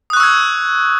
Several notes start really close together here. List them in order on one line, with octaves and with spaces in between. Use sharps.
D#6 F#6 C#6 E6 G#6